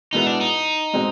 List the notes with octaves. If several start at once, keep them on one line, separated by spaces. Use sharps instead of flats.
B2 G#3 B3 D#4 E4
D4
D#4
B2 G#3 C4